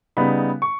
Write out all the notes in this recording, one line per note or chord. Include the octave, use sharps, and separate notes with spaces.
C#3 G3 B3 D#4 B5
C#6